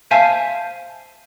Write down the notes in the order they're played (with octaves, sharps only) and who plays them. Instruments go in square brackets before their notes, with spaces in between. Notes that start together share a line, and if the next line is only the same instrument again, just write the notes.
[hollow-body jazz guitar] C5 E5 F5 G#5 A5